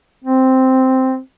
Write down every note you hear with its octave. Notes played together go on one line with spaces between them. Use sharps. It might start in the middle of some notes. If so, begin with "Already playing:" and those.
C4